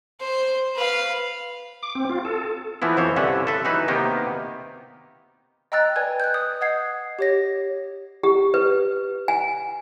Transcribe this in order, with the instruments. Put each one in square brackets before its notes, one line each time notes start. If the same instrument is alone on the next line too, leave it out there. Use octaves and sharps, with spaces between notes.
[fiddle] C5
B4 F5
[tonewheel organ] D6
C4
F4
A4
[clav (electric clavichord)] E3 F3 B3 E4
F2 E3 C5 C#5
C2 G2 D3 C#4 E5 F#5
A4 B4 E5
E3 F#3 D#4 B4
C3 D#3 A#3 B3 D#4 G4
[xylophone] D#5 G5 A#5 E6 F#6 A6
B4 D5 G#5 G#6
F#6 G6
D#6
D#5 F#5 G#6 C7
G4 C#5 A#6
[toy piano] G4
B4
G#5